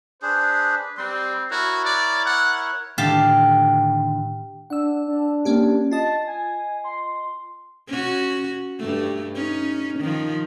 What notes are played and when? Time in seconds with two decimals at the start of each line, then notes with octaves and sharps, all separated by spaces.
0.22 D4 G#4 B4 C5
0.98 G3 C4 C6
1.51 E4 F#4 A#4 C#5
1.85 D5
2.25 F#5
2.98 A2 D3 D#3 G4 F5 A5
4.70 D4 F#5 E6
5.08 D4
5.45 A#3 C#4 G4
5.91 F4 D#5 A5
6.27 G#5
6.84 C6
7.88 C#4 F#4
8.79 G2 A3
9.35 C#4 D#4
10.00 D#3 F3